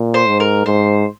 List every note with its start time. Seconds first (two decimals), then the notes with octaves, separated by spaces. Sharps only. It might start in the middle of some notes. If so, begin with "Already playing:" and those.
Already playing: A#2
0.14 C5
0.27 G#2
0.40 A#4
0.66 G#2 C5